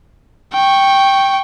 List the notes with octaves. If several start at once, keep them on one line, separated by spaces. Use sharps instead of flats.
G5 C#6